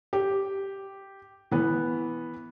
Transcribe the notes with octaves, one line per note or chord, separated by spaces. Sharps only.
G4
E3 B3